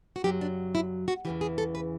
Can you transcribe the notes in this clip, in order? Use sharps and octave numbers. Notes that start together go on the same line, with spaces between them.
F#4
F#2 C#3 F#3 G4
D4
E4
F#4
E2 C#3 E3 G4
G#4
A4
B4